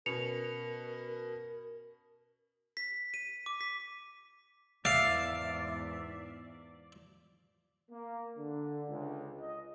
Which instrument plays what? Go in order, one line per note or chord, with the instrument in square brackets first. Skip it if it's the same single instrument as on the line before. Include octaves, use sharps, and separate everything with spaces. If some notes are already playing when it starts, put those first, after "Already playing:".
[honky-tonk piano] B2 C#4 [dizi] A#4 [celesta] C#7 F7
[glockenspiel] B6
D#7
D6
B6
[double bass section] E2 G#2 [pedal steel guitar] D5 [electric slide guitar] E5 [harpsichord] F5
[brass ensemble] A#3
D3
C#2
D#5